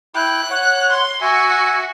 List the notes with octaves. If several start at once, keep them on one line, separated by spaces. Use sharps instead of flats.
E4 G5 F#6
C#5 F#5
C6
F#4 E5 G#5